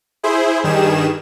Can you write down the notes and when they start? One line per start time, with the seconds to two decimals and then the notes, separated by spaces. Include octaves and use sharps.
0.23 E4 G#4 C5
0.63 G2 D#3 G3 G#4 E7